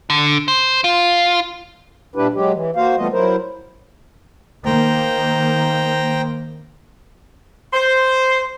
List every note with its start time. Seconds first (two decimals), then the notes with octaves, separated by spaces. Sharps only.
0.10 D3
0.48 C5
0.84 F4
2.16 A#2 G3 D4 E4 G4 B4
2.33 F#3 G#3 G4
2.54 E3
2.76 A#3 F#4 C5 F5
2.97 E3 G3 A3 B3 F4 D#5
3.12 F#3 E4 A#4 C5
4.65 D#3 A#3 C5 G5 A#5
7.73 C5